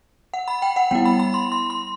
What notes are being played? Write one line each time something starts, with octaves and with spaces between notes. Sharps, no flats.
F#5
B5
G5
F#5
G3 B3 E4 G5
B5
B5
C6
C6
C6